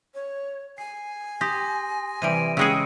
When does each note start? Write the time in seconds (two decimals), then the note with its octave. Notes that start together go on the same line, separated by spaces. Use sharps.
0.15 C#5
0.78 G#5 C7
1.41 G4 C6 D#6 A#6
2.22 C3 E3 G3 D7 D#7
2.57 C#3 G#3 G#4 G5 E6 C#7